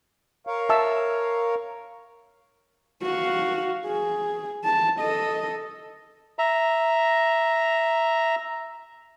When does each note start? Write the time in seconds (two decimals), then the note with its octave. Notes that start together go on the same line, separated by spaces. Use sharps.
0.47 A#4 C#5 F5
0.69 E5 A5 E6
3.03 F#4 F5
3.86 G#4
4.64 A5
5.00 A4 D#5
6.39 E5 A#5